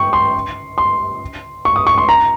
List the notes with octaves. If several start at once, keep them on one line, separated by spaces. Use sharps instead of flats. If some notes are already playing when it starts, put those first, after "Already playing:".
Already playing: G5 C#6
C6
C6
C#6
D#6
C#6
C6
A#5